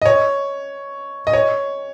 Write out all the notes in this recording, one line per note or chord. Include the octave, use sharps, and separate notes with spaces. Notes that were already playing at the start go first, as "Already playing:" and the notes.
D#5
C#5
D#5
C#5